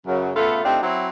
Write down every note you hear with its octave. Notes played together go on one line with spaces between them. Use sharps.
F#2 C#3 F#3
C#3 A3 B3 F4 A4
A3 C4 D4 D#4 F4 G4
F#3 C4 E4